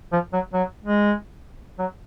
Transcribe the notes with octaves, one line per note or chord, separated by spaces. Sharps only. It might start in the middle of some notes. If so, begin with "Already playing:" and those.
F3
F#3
F#3
G#3
F#3